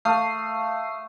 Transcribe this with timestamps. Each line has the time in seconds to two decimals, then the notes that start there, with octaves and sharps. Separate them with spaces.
0.05 A3 F5 D#6 C7